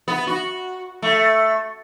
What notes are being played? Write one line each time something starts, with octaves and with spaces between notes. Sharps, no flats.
B3
F#4
A3